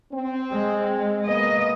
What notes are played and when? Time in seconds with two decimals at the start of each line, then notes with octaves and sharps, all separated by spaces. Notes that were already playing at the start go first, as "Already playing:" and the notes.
0.12 C4
0.52 G#3
1.26 A#3 B3 D#5